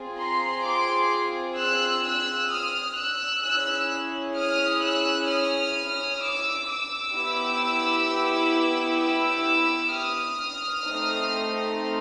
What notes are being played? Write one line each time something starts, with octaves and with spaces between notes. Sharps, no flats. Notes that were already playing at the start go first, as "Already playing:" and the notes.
Already playing: C4 F4 G#4
A#5 C6
C6 D6
E6 F#6
E6 F#6
D#6 F6
E6 F#6
C#4 E4 G#4 E6 F#6
D#6 F6
E6 F#6
D#6 F6
D6 E6
D6 E6
B3 E4 G4
D6 E6
D#6 F6
A3 C4 D#4